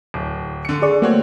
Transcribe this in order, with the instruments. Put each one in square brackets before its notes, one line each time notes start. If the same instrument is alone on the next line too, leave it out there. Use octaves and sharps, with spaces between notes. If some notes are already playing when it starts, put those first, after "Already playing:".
[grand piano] D1
D3 C#7
[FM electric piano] G#4 D5 C#6
[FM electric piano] A3 A#3 [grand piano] C4 F#4 C#5